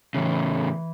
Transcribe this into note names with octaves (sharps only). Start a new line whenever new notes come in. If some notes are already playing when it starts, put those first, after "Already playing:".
A2 C#3 E3